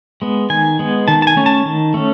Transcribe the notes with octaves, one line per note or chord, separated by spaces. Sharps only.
G#3 B3
D#3 G#5
G#3 B3
D#3 A5
A5
G#5
A3 C#4
A5
D#3
A3 C#4